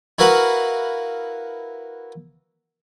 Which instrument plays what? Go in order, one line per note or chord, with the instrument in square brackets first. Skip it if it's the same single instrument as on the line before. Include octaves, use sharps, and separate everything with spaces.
[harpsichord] E4 F#4 A#4 B4 F5 F#5